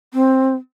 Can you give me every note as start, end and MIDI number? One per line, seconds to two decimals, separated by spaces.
0.14 0.54 60